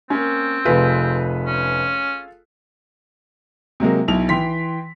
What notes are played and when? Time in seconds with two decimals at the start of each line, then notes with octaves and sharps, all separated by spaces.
0.10 A#3 C4 C#4
0.65 F1 F4 G#4 A4 B4
1.46 C#4
3.80 C3 F#3 G#3 A#3
4.08 B1 E4 F7
4.29 E3 G5 C6 B6